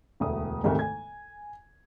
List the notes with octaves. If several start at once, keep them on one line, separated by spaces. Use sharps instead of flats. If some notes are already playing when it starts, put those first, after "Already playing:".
E1 D2 D#6
D2 G#2 C3 D#3 G#3 A3
G#5 G#6